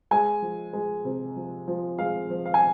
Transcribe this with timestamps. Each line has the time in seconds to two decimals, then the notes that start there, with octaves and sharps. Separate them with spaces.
0.11 G#3 G#5
0.42 F3
0.73 G#3
1.05 C3
1.36 F3
1.68 F3
1.99 G#3 F5
2.30 F3
2.46 F5
2.54 G#5